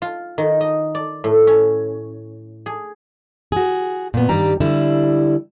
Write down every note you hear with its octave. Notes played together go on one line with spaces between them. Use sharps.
F4
D#3
D#5
D5
A2
C#4
G#4
F#4 G#4
A#2 B3
G2 D#3 G3 G4 A#5
D3 G3 E4